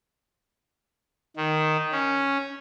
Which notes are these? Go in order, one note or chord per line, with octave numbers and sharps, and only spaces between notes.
D#3
C#4